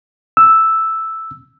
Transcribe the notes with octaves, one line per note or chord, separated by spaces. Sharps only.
E6